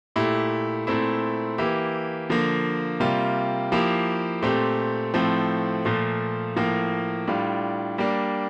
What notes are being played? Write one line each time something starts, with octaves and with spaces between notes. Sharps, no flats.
A#2 A3 E4 G4
A#2 A3 C4 E4
E3 A#3 E4 G4
D3 F3 A#3
C3 G3 A#3 F4
F3 A#3 E4 G4
A#2 A3 C4 G4
A2 F3 A3 C4
A#2 F3 A3
A2 F3 A#3
A2 G3 D4 F4
G3 A#3 D4